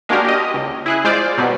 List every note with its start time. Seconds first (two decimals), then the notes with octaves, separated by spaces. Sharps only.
0.09 G#3 A#3 D4 F#4 G4 A#4
0.25 G4 D#5
0.54 C#2
0.86 E4 G#4 F#6
1.04 G#3 F4 C5 D5
1.38 B2 F#3 G3 B3